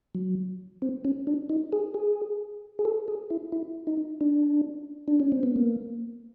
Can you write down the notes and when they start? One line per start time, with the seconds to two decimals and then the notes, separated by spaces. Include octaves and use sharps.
0.15 F#3
0.82 C4
1.05 C#4
1.27 D4
1.49 D#4
1.73 G#4
1.94 G#4
2.79 G#4
2.85 A4
3.08 G#4
3.30 E4
3.52 E4
3.87 D#4
4.21 D4
5.08 D4
5.20 C#4
5.32 C4
5.43 B3
5.56 A#3